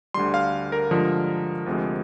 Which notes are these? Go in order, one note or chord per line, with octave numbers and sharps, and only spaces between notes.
D2 D3 G3 C6
F5
A#4
G2 D3 F3 G#3
D2 C3 F3 G#3